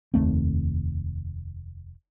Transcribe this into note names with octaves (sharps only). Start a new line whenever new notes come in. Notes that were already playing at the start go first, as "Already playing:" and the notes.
F1 D#2 A3 C4